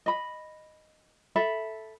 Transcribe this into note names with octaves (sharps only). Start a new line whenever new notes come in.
D#5 B5
A4 E5 B5